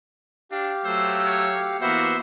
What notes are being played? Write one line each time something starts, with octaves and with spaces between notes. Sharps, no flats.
D4 G4 F5
F#3 A3 C5 E6
C#5
E3 A#3 B3 F#4 C5 E5